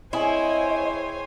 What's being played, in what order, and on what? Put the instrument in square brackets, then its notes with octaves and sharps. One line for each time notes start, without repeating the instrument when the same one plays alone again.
[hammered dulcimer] C4 G#4 [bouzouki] E4 [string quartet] C5 C#5 G#5 [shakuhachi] D#5